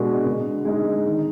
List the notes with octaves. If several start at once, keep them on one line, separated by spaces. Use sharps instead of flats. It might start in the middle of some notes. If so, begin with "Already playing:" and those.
Already playing: B2 G#3 D4 F#4 A#4
D3
G#3 D#4
D#3